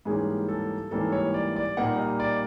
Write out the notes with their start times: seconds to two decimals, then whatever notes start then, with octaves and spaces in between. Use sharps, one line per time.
0.05 G#2 E3 G3 A#3 C#4 G#4
0.48 A4
0.91 G#2 E3 G3 A#3 C#4 A4
1.12 C#5
1.34 D5
1.56 D5
1.77 A#2 G3 A#3 D#4 F#5
1.99 D#5
2.20 D5